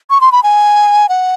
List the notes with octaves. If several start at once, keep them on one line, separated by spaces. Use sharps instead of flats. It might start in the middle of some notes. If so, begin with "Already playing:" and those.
C#6
C6
B5
G#5
F#5